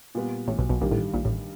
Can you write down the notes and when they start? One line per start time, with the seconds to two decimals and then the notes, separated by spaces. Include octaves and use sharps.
0.15 A#2 G3 B3
0.48 A1 A2
0.58 B1 B2
0.69 B1 B2
0.81 A#1 G2 A#2 D#3 G3
0.91 A1 A2
1.14 A#1 A#2
1.25 A1 A2